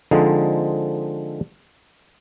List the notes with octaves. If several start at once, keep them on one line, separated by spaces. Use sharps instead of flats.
D3 F3 G#3 C4 D#4